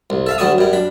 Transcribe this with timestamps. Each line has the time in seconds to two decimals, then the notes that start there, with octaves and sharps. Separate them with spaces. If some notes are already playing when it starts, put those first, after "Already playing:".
0.10 C2
0.26 A4 E5 F5
0.38 D2 F#3 G3 A5 C#6 D#6
0.58 F#2 G3
0.73 D4 B5